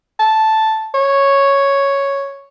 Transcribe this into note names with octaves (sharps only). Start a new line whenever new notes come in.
A5
C#5